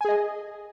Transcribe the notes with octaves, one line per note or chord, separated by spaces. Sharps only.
G#4 D#5 G#5